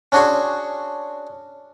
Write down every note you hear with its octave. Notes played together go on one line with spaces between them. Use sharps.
C#4 D4 F#4 G#4 C6 C#6